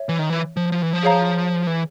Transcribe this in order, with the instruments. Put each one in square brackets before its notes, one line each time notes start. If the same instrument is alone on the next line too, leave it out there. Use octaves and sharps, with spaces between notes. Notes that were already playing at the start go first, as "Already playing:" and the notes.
Already playing: [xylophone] C#5 E5
[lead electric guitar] E3
D#3
E3
F3
F3
E3
F3
[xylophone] G#4 C#5 F5 A#5
[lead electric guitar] E3